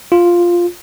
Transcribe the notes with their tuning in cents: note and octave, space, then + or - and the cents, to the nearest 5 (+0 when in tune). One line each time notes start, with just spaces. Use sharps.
F4 +0